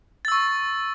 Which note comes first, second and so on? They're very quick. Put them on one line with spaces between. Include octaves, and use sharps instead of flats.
A6 E6 C#6